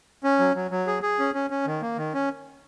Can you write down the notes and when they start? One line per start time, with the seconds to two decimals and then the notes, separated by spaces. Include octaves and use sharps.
0.24 C#4
0.39 F#3
0.55 F#3
0.71 F#3
0.87 G#4
1.03 G#4
1.19 C#4
1.34 C#4
1.50 C#4
1.66 D#3
1.82 A#3
1.98 D#3
2.14 C#4